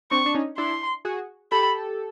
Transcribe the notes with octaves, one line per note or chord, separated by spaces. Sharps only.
C4 D4 C#6
D4
C#4 D#4
D4 E4 C6
F#4 G#4
G4 A4 B5